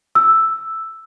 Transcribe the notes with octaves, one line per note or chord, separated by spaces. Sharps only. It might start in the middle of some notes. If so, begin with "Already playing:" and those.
E6